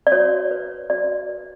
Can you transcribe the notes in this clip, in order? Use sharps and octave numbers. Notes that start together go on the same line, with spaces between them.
D5
F#4 C#5
B4
F#4 D5
B4